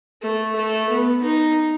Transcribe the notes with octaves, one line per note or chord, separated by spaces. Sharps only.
A3
A3
B3
D#4